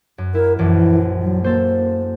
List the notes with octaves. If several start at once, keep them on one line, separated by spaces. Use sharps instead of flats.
F#2
E4 A#4
A#1 F#2 E3
F#3
A#3 A4 C5